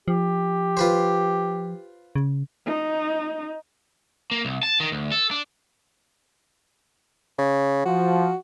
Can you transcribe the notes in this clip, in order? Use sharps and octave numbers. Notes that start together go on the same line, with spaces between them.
F3 G4
F4 B4 C5
C#3
D#4
A#3
C2
A5
D#3
D2
A4
D4
C#3
F3 F#4